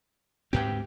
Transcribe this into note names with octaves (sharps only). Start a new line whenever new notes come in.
D2 G#2 C4 G4 B4 G5